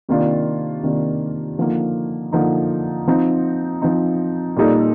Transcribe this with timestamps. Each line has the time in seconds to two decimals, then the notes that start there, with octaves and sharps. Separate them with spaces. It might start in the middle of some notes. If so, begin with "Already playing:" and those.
0.09 C3 D#3 A#3 D4 F4
0.83 C3 D#3 A#3 D4 F4
1.58 D3 F3 A#3 D#4
2.33 D3 F3 A#3 D#4
3.07 F3 C4 D#4
3.82 F3 C4 D#4
4.56 A#2 G3 A#3 D#4 A4